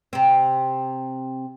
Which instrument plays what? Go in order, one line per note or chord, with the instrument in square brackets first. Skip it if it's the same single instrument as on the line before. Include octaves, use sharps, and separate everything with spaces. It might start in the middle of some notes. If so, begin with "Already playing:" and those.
[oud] C3 C4